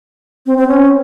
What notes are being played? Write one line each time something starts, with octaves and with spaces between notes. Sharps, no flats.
C4
C4
C#4